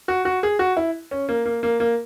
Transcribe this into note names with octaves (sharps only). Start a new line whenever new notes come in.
F#4
F#4
G#4
F#4
E4
C#4
A#3
A#3
A#3
A#3